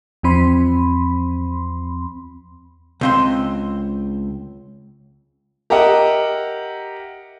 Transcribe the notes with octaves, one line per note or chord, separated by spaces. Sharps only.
E2 F3 C4 B5 C6
C#2 C4 C6
G4 A#4 D#5 E5 F#5